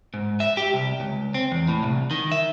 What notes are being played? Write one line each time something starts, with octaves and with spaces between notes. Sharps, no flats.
G#2
E5
G4
C2
C#2
C4
E2
A2
C2
D#3
E5